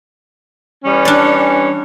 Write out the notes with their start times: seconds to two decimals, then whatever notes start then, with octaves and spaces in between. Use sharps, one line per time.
0.85 E3 G3 C#4
1.05 D4 D5